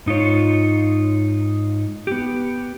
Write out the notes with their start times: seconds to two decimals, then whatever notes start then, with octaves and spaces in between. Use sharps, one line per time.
0.06 G#2 D#4 F4 C#5
2.07 B3 G4